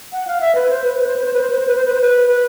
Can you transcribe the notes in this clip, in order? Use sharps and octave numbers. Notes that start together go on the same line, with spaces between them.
F#5
F5
E5
B4
C5
B4
B4
C5
B4
C5
B4
C5
B4
C5
B4
C5
B4
C5
B4
B4